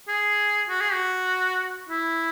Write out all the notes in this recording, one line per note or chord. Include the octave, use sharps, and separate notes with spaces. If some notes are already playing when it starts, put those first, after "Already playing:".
G#4
F#4
G#4
F#4
E4